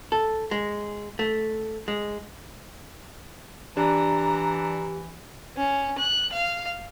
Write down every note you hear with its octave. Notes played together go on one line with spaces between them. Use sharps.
A4
G#3
A3
G#3
E3 D4 G4 A#5
C#4
F#6
F5